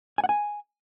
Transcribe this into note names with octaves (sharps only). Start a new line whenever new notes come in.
G#5
F#5
G#5